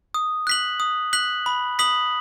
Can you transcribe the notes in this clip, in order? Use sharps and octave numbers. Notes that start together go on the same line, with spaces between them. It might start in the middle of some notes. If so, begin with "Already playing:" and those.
D#6
F#6 B6 F#7
D#6
F#6 B6 F#7
B5
D#6 B6 F#7